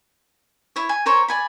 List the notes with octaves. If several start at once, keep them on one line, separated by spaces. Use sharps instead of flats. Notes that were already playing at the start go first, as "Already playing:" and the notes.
E4 C#5
G#5
A#4 C5 C#5 C#6
D5 G#5 B5